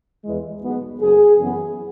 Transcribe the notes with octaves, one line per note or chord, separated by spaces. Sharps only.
E2 E3 G#3
B1 B2 G#3 B3
F#1 F#2 F#3 G#4
F#2 C#3 E3 B3